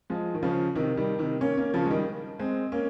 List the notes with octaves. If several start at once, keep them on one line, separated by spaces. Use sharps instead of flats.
F3 G#3
D#3
C#3 F3
C3 D#3
D#3 G3
C3 D#3
A#3 C#4
A#3 C#4
C#3 F3
G#3
D#3 G3
G#3 C4
A#3 C#4